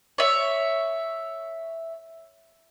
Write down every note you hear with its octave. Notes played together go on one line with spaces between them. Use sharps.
C#5 E5